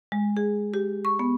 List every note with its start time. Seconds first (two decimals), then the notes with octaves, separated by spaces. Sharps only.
0.12 G#3
0.37 G#4
0.74 G4
1.05 C#6
1.19 B3